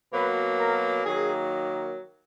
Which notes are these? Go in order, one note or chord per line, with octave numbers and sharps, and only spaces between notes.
B2 F#3 A#3 B4
A#4
D#3 F#3 A#3 G#4